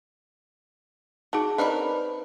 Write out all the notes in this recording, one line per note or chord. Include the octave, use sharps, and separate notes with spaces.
D#4 F#4 G#4 A5
C4 A#4 B4 D5 D#5 B5